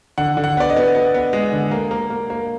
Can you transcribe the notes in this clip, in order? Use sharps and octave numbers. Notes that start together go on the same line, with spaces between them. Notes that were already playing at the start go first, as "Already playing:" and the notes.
D3 F#5
D3
F#5
B3 D5
D#5
B3
B3
B3
G#3
D3
A#3
A#3
A#3
A#3